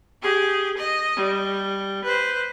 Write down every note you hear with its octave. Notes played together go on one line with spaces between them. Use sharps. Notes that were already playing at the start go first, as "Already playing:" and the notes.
G4 G#4
D#5
G3
B4 C5